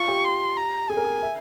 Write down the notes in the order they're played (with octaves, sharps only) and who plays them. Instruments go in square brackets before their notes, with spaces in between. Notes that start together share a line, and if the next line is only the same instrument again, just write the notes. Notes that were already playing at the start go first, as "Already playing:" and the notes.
Already playing: [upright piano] F4 [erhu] C#6
[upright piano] G4
[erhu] C6
A#5
[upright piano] G#4 [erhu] G#5
[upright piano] A#4
G#4
E5